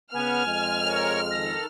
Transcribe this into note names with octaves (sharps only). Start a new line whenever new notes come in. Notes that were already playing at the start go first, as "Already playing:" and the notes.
C#3 B3 G#5 F6
F2 G#3
A#4 C#5
D#3 A4 A#6